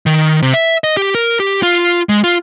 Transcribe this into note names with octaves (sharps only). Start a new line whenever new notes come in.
D#3
C3
E5
D#5
G4
A#4
G4
F4
G#3
F4